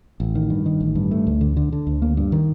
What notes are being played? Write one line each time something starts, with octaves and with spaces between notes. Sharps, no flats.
A1
D#3
G2
D#3
A1
G2
A3
D2
D3
D3
D3
D2
A#3
G2
D#3